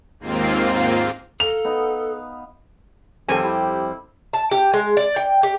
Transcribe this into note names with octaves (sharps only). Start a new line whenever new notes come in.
D#2 G#2 A#3 C4 F4 C7
A4 F5 A#5 F7
B3 D#4
F2 D#3 G3 C4 A4 G#5
E4 G4
A5
G4
G#3
D5
G5
G4